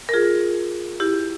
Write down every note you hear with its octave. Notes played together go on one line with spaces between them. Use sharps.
A#4
F4 G#4
E4 G4